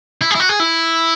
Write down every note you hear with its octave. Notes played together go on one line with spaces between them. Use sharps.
E4
G#4
E4
F#4
G#4
E4